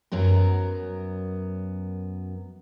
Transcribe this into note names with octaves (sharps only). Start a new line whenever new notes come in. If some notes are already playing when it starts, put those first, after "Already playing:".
F#2 F#3 B3 A#4